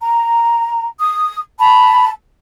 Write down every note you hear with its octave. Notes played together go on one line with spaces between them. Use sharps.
A#5
D#6
A5 B5